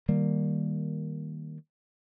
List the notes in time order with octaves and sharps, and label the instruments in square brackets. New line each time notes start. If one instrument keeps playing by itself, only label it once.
[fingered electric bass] D#3 G3 A#3